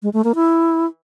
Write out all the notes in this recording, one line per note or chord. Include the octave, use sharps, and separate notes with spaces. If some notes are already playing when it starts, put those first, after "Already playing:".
G#3
A3
A#3
E4